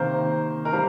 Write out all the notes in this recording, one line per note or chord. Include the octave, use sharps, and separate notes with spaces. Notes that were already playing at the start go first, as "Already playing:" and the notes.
Already playing: C3 D#3 A#3 C5
A#4
G3 A#3 C5